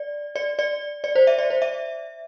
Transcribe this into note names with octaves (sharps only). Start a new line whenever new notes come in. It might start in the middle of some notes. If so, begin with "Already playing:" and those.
Already playing: D5
D5
D5
D5
C5
E5
D5
C5
E5